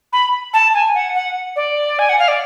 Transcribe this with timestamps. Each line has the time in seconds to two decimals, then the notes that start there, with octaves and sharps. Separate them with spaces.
0.13 B5
0.54 A5
0.74 G#5
0.95 F#5
1.15 F#5
1.56 D5
1.99 G#5
2.09 F#5
2.19 F5
2.28 D5